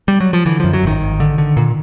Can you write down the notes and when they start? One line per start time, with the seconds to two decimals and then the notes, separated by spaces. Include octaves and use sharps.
0.08 G3
0.20 F#3
0.33 F3
0.46 D3 E3
0.60 F#2 F3
0.73 F#3
0.84 G#1 D#3
1.01 G#1
1.20 D3
1.38 D3
1.57 A#2